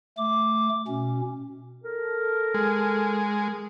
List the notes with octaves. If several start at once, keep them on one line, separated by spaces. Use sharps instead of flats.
A3 D6
B2 C#4
A4 A#4
G#3